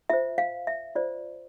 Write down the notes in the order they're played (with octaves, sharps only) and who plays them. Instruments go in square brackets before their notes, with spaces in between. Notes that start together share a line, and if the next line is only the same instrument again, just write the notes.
[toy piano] F4 C5 E5
F5
E5
F4 C5 D5